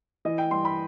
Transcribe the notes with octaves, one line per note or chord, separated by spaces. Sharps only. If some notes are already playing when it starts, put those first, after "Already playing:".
E3 D#5
G5
G2 C6
B5